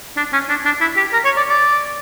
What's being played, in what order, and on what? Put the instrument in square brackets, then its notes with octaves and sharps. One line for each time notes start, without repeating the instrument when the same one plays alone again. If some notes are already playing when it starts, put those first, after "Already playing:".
[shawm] D4
C#4
D4
D4
E4
G4
A#4
C#5
D5
D5